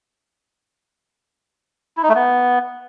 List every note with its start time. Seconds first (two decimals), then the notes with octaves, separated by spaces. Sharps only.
1.97 E4
2.03 D#4
2.09 A3
2.15 B3